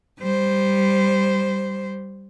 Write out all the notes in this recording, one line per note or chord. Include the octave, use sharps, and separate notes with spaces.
G3 C5